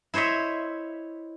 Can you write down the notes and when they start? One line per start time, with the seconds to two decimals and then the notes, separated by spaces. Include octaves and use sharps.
0.14 E4 C5 C#5 D#5 E5